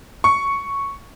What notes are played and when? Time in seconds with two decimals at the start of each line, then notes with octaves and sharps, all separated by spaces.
0.24 C#6